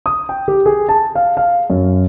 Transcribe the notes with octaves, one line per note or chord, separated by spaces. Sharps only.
D#6
G5
G4
G#4
A5
F5
F5
F#2